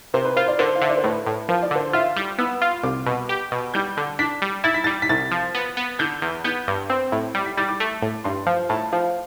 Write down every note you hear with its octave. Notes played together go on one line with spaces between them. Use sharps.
C3 C5
B4
F4 C5
D5
D3 C5
F5
D3 E5
D5
C5
A2 B4
A2
F3 C5
D5
D3 C5
F4 E5
G3 D6
B3 E6
F4
C2 D6
B2
G4
B2
G3 G6
D3
D4 B6
G3
E4 A6
B6
G3 A6
B6
C2 A6
F3
B3
B3
D3 G6
E2
B3 G6
G2
C4
A2
G3
B6
G3 A6
D6
A3
A2
G2 C6
F3
A2 A5
F3 F5